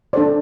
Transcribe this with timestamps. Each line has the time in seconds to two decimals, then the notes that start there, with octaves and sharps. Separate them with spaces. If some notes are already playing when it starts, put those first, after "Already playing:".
0.13 D4 A4 C5 D5